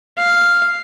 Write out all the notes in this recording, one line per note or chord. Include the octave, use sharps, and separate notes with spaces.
F5